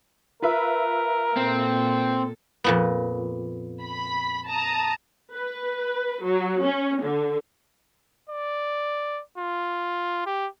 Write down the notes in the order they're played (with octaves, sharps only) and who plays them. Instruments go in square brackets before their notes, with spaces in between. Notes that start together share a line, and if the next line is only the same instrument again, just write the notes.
[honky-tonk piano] F4 B4 E5 [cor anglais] A#4
[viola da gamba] A#2 A4 [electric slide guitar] C4
[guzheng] F2 A#2 B3
[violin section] B5
A5 A#5 D#6
[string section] B4
F#3
C#4
D3
[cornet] D5
F4
G4